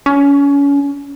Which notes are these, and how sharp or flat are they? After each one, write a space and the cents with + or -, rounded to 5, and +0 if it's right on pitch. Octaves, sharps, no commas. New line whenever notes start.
C#4 +30